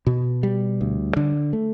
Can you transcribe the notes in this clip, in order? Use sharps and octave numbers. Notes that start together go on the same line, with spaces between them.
B2
G3
D2
D3
A3